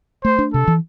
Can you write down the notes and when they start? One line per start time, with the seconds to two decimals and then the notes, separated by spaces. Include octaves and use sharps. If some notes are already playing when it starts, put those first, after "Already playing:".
0.24 A3 C5
0.39 D4
0.54 C3 A4
0.68 E3